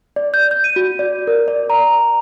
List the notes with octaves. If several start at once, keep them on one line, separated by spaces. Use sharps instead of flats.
D5
G6
G6
D#7
F#4
D5
A#4
D5
A#5